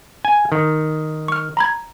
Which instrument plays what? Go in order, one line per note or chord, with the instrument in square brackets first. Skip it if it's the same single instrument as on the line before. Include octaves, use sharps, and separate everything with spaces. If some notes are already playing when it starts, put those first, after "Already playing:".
[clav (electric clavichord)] G#5
D#3
[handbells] C#6 F6
A#5 B5 G#6